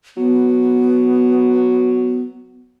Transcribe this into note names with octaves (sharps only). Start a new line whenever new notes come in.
F#3 B3